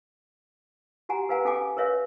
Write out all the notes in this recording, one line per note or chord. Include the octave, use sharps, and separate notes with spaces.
F#4 G4 F#5 G#5 A#5
A#4 B4 F5 F#5 G#5 A#5
C#4 A4 F5 G5 G#5 D6
A#4 B4 C#5 E5 F5